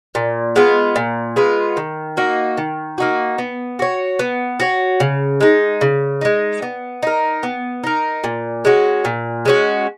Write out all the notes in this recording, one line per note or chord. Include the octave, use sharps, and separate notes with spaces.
A#2
G#3 B3 F4
A#2
G#3 B3 F4
D#3
A#3 D#4 F#4
D#3
A#3 D#4 F#4
B3
F#4 C#5
B3
F#4 C#5
C#3
G#3 D#4
C#3
G#3 D#4
B3
D#4 A#4
B3
D#4 A#4
A#2
G#3 C#4 F#4
A#2
G#3 C#4 F#4